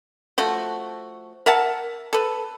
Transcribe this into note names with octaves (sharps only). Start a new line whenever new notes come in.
F3 A3 F#4
A#4 E5 F#5 A5
A4 B4